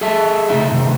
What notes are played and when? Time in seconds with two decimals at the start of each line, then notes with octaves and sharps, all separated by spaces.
0.01 G#4 A4 E5 A5
0.49 C#3 A3 D#4 A4 E5
0.71 A2 C3 D#3